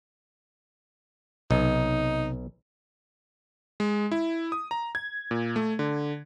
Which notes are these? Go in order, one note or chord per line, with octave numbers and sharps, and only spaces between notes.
B1 C3 C4 D#4
G#3
E4
D#6
A#5
G#6
A#2
A3
D3